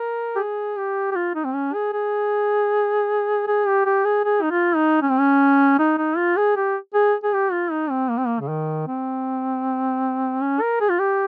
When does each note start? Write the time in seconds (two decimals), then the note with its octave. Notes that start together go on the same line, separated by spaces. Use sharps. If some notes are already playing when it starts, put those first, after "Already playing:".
Already playing: A#4
0.35 G4
0.39 G#4
0.78 G4
1.12 G4
1.16 F4
1.35 D#4
1.44 C4
1.54 C#4
1.74 G#4
1.93 G#4
3.47 G#4
3.67 G4
3.86 G4
4.05 G#4
4.25 G#4
4.42 D#4
4.51 F4
4.76 D#4
5.02 C#4
5.11 C4
5.20 C#4
5.79 D#4
5.98 D#4
6.17 F4
6.37 G#4
6.56 G4
6.94 G#4
7.24 G#4
7.33 G4
7.52 F4
7.72 D#4
7.91 C4
8.10 A#3
8.18 C4
8.27 A#3
8.41 C#3
8.49 D#3
8.87 C4
10.41 C#4
10.61 A#4
10.81 G#4
10.90 F4
11.00 G4